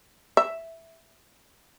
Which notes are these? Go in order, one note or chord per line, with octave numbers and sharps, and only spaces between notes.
E5